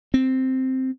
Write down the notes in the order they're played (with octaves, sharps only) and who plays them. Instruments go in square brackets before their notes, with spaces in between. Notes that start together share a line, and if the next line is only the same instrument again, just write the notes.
[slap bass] C4